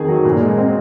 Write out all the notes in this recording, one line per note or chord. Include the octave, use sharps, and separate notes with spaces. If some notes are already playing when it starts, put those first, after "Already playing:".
Already playing: F2 D#3 G#4
F#3
A#2
G#3
C4